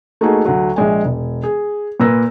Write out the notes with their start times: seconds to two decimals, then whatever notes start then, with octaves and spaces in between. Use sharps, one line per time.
0.21 A3 A#3 D#4 F#4 G#4
0.45 D2 F#3
0.76 A#1 G#3 G#5
1.04 E1
1.44 G#4
2.00 A#2 A#3 B4 E6 A#6